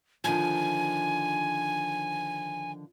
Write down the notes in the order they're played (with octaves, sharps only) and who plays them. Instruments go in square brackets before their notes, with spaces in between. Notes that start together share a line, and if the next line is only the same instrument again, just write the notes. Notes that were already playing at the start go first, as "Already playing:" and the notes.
[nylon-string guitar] D3 D#3 F3 [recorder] G#5